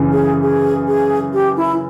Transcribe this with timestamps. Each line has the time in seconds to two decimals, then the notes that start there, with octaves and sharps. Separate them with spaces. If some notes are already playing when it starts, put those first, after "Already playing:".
Already playing: F#2 C#3 E3
0.12 G#4
0.42 G#4
0.87 G#4
1.33 G4
1.57 E4